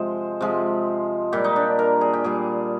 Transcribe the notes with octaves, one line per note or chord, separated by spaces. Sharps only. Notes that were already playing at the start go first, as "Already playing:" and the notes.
Already playing: C3 F3 G#3 C5
C3 F3 G#3
A#2 G3 G4
D#4
D4
A#4
G#4
G4
A#2 G3 G#4